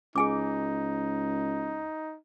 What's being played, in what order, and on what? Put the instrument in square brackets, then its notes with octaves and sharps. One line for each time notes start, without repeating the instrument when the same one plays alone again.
[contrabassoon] C#2 [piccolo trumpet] D#4 [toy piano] G#4 G#5 D6